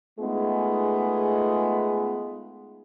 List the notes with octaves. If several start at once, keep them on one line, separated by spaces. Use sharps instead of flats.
G#3 A3 B3 D#4 F4 G#4